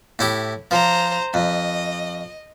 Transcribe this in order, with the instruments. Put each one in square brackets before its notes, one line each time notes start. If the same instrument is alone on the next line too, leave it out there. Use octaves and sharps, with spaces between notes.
[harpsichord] A2 E4 G4
[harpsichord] F3 [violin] C5 A#5
[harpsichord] F2 [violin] D#5